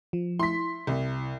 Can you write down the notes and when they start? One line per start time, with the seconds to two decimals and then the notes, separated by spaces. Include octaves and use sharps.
0.13 F3
0.39 E4 C6 B6
0.87 C2